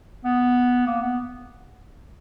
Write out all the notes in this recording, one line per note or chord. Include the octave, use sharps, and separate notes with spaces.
B3
A#3
B3